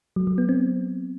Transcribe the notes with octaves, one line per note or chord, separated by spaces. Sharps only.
F#3
F#3
B3
C4